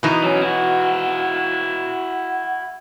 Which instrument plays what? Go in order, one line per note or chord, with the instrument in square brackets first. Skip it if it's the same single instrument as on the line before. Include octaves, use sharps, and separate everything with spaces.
[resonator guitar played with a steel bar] B2 E3 D#4
[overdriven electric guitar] F#3 C#4
E4 F#4